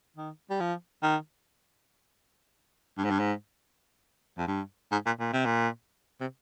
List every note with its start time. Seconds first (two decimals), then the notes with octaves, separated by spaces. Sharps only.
0.17 D#3
0.51 G3
0.61 F3
1.03 D#3
2.98 G2
3.04 G#2
3.11 G2
3.19 G#2
4.38 F2
4.48 G2
4.92 G#2
5.06 A#2
5.20 A#2
5.33 C3
5.45 A#2
6.21 C3